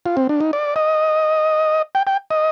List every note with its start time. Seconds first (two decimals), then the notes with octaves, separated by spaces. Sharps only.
0.06 F4
0.17 C4
0.29 D4
0.41 D#4
0.53 D5
0.76 D#5
1.95 G5
2.07 G5
2.31 D#5